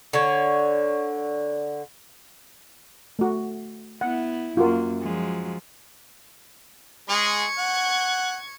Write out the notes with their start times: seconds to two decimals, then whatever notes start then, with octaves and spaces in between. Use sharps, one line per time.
0.13 D3 C#5
3.19 A3 F#4
4.01 B3 E4 F#5
4.57 F#2 A#3 F4 F#4 A#4
5.01 F3 F#3 G#3
7.09 G#3 G#4 C#6 G#6
7.58 F#5